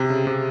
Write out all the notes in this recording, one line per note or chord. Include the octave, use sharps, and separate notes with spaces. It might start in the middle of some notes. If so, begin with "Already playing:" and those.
Already playing: C3
C#3
C3